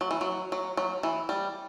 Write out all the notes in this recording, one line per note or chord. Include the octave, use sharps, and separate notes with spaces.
F#3
E3
F#3
F#3
F#3
E3
G3